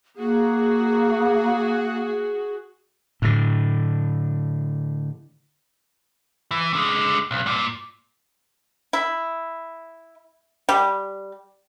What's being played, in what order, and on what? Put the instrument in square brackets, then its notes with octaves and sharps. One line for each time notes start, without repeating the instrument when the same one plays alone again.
[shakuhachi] A#3 [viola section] F#4 G#4
[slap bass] A2 D3
[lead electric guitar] E3
D3 G#3
B1
G2 A#2
[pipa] E4
G3